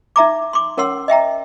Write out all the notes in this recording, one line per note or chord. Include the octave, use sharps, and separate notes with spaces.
D#4 E5 A#5 D6
C6 D6
C#4 A#4 C#5 F#5 C6 E6
D#5 E5 G5 A#5